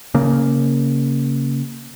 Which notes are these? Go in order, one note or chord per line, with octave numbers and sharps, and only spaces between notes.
C#3 A#3